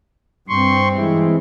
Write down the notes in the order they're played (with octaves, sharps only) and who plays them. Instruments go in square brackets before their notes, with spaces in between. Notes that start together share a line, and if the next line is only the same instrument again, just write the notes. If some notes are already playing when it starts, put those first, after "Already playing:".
[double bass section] G2 C4 [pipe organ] C6 C#6
[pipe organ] E3 G#3 E4